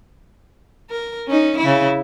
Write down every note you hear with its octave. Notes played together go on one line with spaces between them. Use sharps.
A#4
C#4 D#4
C#3 E4